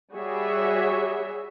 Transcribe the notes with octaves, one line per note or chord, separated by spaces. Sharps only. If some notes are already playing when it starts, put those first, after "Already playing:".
G3 F#4 G#4 C#5 E5